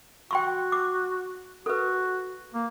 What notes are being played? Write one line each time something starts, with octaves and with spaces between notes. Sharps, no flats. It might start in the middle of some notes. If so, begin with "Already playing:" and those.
F#4 G5 C6 C#6
D6
F#4 A4 B4
A#3